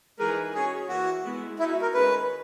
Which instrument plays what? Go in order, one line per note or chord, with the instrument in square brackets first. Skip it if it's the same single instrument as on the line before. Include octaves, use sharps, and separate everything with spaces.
[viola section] E3 G#3 D#4 G#4 B4 [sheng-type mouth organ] A#4
[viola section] C#4 F#4 C#5 [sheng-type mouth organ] G#4
[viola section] E3 A#3 E4 [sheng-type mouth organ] F#4
[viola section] G#3 B3 E4
[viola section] G#3 D#4 F#4 [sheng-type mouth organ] E4
[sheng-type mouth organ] A#4
[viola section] D#3 G#3 C#4 G#4 C#5 [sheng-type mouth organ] B4